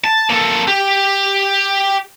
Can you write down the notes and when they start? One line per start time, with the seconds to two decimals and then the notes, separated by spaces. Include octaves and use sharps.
0.04 A5
0.30 A#3 A4
0.68 G4